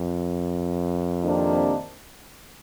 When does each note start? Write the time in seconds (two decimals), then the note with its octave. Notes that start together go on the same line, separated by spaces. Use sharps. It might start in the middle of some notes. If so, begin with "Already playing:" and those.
Already playing: F2
1.22 C3 D#3 A#3 D4 G4